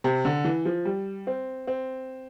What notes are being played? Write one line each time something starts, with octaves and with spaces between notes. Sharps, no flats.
C3
D3
E3
F3
G3
C4
C4